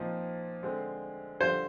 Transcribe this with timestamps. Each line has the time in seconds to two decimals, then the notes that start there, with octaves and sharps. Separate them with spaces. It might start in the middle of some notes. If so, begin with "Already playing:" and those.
Already playing: A#2 F3 C4 D#4
0.63 D3 G#3 C4
1.40 D3 G3 D4 F4 C5